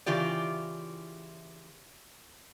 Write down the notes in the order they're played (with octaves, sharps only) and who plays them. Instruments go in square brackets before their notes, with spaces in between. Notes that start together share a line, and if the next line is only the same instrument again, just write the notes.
[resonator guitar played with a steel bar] C#3 E3 F4 G4 D5